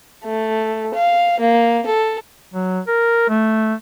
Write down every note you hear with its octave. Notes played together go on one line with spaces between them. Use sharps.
A3
F5
A#3
A4
F#3
A#4
A3